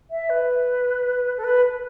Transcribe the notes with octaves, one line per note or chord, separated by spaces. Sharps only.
E5
B4
A4
B4